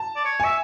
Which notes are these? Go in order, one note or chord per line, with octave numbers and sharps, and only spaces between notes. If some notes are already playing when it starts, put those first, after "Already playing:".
Already playing: A5
D5
C#5
E5 G#5